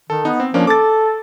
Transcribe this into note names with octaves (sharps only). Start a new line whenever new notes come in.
D#3 A4
B3 D#4
C4
F3 A#3 C#4 D4
A4 D6 A6